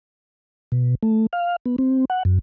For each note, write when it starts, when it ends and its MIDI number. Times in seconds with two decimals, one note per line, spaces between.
0.72 0.95 47
1.03 1.26 57
1.33 1.56 77
1.66 1.76 59
1.78 2.05 60
2.10 2.23 78
2.25 2.39 42